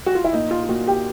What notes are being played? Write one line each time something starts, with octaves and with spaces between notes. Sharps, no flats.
F#4
F4
E4
A#2 D#4
F4
F4
A#2 F#4
G4